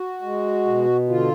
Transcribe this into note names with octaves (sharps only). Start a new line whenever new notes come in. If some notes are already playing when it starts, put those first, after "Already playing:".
Already playing: F#4
G#3
B2
D3 F4